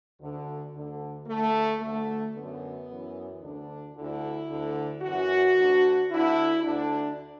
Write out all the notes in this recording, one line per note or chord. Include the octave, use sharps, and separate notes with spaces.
D2 D3
D2 D3
D2 D3 A3
D2 D3 A3
F#2 D3 B3
F#2 E3
D2 D3 D4
D2 D3 E4
D2 D3
F#2 E3 F#4
D2 D3
D2 D3 E4
D2 D3 D4